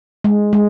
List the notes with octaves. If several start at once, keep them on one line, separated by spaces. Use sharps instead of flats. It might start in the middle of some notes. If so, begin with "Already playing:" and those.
G#3
G#3